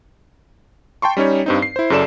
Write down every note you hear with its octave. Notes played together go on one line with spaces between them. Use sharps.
G5 A5 C6 C#6
G3 C#4 D#4 C#5
G2 C4 D#4
C7
E4 C5
F#2 C#3 A4 D5 E7